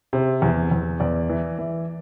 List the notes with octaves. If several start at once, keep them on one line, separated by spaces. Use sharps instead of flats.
C3
E2
E2
E2 D5
E3
E3